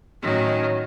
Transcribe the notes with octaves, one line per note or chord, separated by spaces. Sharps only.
A2 D#3 F#3 C#4